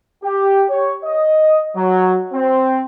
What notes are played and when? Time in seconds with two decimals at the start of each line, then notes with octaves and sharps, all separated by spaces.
0.23 G4
0.70 C#5
1.04 D#5
1.76 F#3
2.33 C4